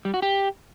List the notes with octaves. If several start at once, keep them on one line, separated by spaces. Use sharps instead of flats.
G3
F#4
G4